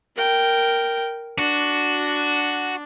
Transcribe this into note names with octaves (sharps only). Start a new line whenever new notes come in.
A#4 G5
D4 F#4